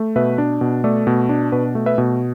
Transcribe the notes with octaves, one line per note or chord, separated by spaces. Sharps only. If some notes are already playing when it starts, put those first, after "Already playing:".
Already playing: A3
B2 B4 E5
D4
B2
A3 A4 D5
B2
D4
B2 F#4 B4
A3
B4 E5
B2